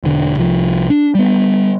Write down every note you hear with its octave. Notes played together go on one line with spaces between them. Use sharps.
E1 D3
C2 F3
D4
G3 B3